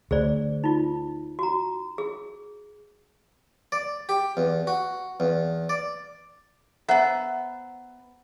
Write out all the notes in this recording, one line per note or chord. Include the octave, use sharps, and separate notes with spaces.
D2 G#4 C5 D5
D#4 F4
F#4 A#5
G#4
D5
G4
E2
F#4
E2
D5
B3 C5 E5 F#5 A#5